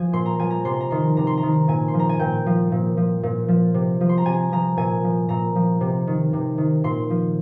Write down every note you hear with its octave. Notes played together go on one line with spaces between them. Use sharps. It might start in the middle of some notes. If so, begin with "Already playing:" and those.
Already playing: F3 G#5
A#2 C6
A#5
F3 G#5
A#5
C3 C6
A#5
D#3 C6
C3 A#5
C6
A#5
D#3
A#2 G#5
C6
F3
A#5
G#5
A#2 G5
F3
A#2
F3
A#2
F3
C3
F3
C6
A#5
C3 G#5
F3 A#5
A#2 G#5
F3
A#2 A#5
F3
C3
D#3
C3
D#3
A#2 C6
F3